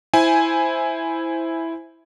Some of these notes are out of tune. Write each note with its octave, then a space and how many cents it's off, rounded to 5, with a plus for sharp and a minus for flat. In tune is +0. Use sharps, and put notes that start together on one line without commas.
E4 +0 C5 +0 G#5 +0